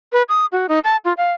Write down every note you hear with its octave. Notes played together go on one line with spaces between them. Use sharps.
B4
D#6
F#4
D#4
A5
F4
F5